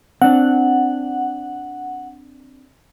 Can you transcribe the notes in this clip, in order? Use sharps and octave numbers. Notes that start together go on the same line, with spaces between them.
C4 D4 F#5